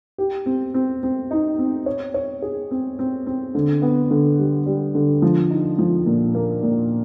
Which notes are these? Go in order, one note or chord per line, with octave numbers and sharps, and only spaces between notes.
G4
C4
C4
C4
D#4
C4
C#5
C#5
G#4
C4
C4
C4
D3
B3
D3
G3
G3
D3
F3
D#4
F3
A#2
A#3
A#2